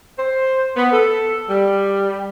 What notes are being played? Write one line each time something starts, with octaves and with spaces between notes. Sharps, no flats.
C5
B3
A4
G3